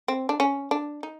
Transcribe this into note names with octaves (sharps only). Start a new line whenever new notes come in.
C4
D4
C#4
D4
D#4